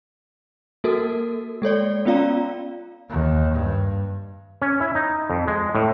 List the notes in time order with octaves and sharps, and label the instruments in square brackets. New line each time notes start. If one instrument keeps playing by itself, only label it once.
[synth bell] A#3 F#4 A4 A#4
G#3 A4 C#5 D5
B3 C#4 F4 D5 F5 A#5
[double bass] D#2
G2
[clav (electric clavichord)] C#4
E4
D#4
F2
G#3
A2